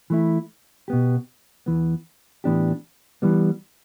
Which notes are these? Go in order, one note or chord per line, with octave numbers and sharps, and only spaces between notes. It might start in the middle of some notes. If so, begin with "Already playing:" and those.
E3 A3 E4
B2 B3 G4
E2 E3 B3
A2 E3 B3 D4 G4
E3 G3 B3